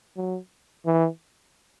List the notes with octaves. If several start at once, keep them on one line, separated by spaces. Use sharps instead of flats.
F#3
E3